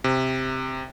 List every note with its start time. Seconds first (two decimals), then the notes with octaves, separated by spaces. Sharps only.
0.04 C3